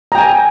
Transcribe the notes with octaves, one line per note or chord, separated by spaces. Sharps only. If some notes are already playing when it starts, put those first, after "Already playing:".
G5 G#5 A#5